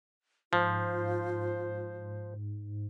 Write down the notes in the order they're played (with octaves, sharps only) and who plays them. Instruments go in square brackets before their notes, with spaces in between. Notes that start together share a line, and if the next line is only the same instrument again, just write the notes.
[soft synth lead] G#2 [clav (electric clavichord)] F3 [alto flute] F4 [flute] C5